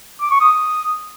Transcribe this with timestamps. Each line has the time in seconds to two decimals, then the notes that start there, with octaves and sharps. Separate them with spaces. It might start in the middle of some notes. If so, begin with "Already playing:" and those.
0.21 D6
0.31 C#6
0.41 D#6